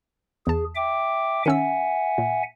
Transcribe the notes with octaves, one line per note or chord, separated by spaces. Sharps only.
E2 G#4 A5
E5 G5 D6
D#3 C#4 E5 F#5 G#5 E6
A#2